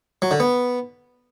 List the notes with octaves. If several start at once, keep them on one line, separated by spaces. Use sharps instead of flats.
F#3
D3
B3